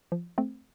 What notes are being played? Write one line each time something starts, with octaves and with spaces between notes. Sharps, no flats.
F3
A3 C4